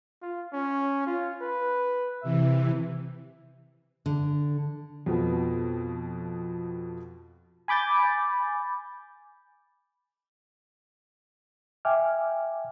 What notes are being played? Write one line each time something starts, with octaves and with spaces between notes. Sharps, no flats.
F4
C#4
F4
B4
C3 E3 E5
D3
F2 B2 F3 B3
G#5 B5 D6 G6 A6
E5 G5 G#5 D6 F6